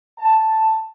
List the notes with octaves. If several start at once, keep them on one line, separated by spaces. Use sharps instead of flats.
A5